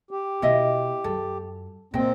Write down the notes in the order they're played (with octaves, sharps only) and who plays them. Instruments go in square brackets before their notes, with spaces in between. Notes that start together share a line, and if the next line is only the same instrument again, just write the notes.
[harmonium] G4
[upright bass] B2 [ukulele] E4 D#5 E5
[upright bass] F#2 [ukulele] A4
[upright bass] A#2 [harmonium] C4 [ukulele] D#5 G5